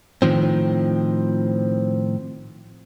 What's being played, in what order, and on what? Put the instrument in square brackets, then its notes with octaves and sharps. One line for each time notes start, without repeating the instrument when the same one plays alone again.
[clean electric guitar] A2 D#3 F3 C4